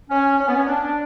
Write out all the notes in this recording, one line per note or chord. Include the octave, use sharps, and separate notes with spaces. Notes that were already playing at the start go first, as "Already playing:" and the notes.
C#4
C#4
B3
C#4
D4